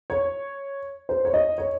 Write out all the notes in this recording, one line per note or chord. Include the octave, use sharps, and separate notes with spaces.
C#5
C5
C#5
D#5
C#5